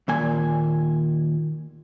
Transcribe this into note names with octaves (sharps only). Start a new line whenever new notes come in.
D#2 A#2 G#5